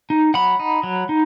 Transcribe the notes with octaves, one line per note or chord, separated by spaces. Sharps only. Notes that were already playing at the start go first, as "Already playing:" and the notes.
D#4
F#3 F#5 B5
D#4
F#3
D#4